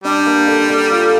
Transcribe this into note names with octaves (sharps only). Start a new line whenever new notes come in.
G3 D4
A#3
D3
D3
F4